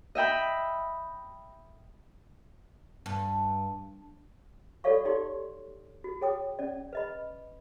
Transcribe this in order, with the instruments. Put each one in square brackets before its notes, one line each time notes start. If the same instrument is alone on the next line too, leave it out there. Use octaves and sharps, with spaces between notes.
[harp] D#5 E5 G5 B5
[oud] G2
[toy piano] F#4 A4 C#5 D5 F5 C#6
D#4 G4 D5 C6
F#4
G#4 C#5 G5 D#6
C#4 D5
B4 D#5 B5